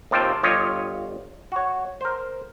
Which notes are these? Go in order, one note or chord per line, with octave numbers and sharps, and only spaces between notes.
D#2 C3 F4 G5 A5
G1 F4 G4 C#5 D#5
F#4 C#5
A#4 C5